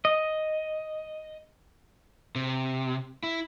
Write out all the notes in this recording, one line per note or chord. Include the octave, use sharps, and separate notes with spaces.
D#5
C3
E4